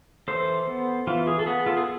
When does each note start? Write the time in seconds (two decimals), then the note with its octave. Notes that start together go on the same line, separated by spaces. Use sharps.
0.28 E3 A4 C5
0.67 B3
1.07 E3 F4
1.27 G#4
1.39 A4
1.46 B3 G#4
1.66 F4 A4
1.77 G#4